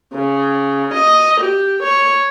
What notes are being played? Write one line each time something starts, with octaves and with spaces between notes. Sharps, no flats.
C#3
D#5
G4
C#5